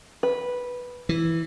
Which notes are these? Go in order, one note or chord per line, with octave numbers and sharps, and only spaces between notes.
B4
E3